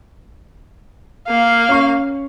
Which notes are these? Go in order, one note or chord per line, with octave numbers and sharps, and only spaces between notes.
A#3 F5
C#4 C#6